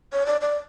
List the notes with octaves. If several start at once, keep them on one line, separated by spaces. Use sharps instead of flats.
C#5
D5
D5